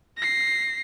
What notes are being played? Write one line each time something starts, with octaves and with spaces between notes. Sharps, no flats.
A#6 C7